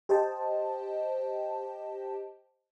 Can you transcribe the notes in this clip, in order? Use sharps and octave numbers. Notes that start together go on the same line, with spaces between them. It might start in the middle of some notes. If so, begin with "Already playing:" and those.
G4 C5 D#5 G5 A5